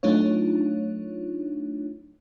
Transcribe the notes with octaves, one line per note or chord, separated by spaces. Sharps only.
F#3 A3 D4 D#4 F4 C#5